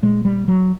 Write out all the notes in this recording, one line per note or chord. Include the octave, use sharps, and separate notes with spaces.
A#2 G#3
G3
F#3